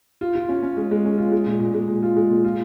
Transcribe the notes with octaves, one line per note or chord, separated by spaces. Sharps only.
F4
F4
C#4
C#4
G#3
G#3
C#4
F4
G#3
A#2
A#2
G#3
A#2
F4
G#3
A#2
F4